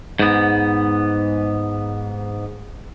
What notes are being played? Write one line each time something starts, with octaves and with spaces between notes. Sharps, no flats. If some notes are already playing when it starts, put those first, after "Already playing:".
G#2 B3